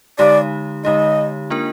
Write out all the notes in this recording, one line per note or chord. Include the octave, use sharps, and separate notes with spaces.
D3 G#3 D#4 G4 D5
D3 G#3 D#4 G4 D#5
A#3 D4 F4 A#4